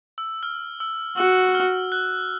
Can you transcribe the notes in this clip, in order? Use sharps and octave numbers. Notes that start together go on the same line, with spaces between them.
E6
F6
E6
F#4 E6
F6
F#6